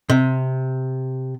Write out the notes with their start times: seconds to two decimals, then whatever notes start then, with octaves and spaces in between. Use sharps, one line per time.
0.10 C3